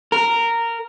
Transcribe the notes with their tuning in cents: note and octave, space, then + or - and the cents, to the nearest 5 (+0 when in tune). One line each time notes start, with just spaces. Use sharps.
A#4 -10